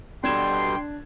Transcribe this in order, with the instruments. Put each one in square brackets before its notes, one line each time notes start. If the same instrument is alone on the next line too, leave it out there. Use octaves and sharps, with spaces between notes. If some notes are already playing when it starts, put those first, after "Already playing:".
[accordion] B2 D3 G3 [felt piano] D4 G#6 E7 [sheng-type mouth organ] G5 [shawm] C6